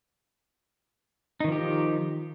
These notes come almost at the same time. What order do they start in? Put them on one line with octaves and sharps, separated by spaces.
D#4 D#3 F3 G4